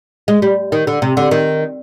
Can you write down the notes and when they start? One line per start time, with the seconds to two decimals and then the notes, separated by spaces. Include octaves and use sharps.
0.28 G#3
0.42 G3
0.72 D#3
0.87 D3
1.02 C3
1.17 D3
1.31 D#3